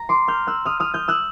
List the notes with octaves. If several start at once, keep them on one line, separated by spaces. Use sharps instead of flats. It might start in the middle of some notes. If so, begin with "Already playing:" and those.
Already playing: A#5
C6 D6
F6 G6
E6 F#6
D#6 F6
D#6 F6
F6 G6
E6 F#6